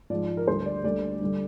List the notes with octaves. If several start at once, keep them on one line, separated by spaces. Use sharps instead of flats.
G#2 F3 D5
A#4
D2 D3 G3 C5
D5
D2 D3 G3 D5
G2 D3 G3